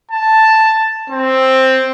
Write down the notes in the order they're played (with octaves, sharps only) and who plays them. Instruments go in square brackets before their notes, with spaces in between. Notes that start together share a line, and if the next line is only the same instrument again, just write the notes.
[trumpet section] A5
C4